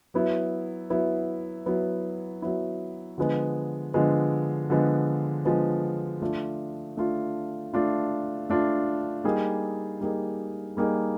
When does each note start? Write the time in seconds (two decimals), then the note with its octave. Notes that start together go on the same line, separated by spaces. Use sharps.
0.14 F#3 B3 E4
0.90 F#3 B3 E4
1.66 F#3 B3 E4
2.42 F#3 B3 E4
3.18 D3 F3 G#3 B3
3.94 D3 F3 G#3 B3
4.70 D3 F3 G#3 B3
5.45 D3 F3 G#3 B3
6.22 A3 D4 F4
6.97 A3 D4 F4
7.74 A3 D4 F4
8.49 A3 D4 F4
9.24 G3 A#3 D#4 G#4
10.01 G3 A#3 D#4 G#4
10.77 G3 A#3 D#4 G#4